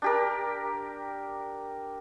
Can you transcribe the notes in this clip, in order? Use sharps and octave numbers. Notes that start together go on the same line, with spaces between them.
D4 G4 A#4